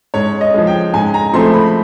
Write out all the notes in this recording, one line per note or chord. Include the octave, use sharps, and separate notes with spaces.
G#2 C#5
D#5
F3 G#3
G5
G#2 G#5
A#5
F3 A3 C4 C6
B5